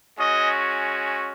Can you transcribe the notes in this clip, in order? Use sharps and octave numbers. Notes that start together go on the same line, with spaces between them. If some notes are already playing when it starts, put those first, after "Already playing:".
G#3 C#4 F#4 D#5